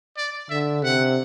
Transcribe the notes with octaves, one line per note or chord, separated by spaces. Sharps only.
D5
D3 E5
C3 F#5